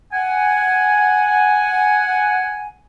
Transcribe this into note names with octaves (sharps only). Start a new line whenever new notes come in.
F#5 G#5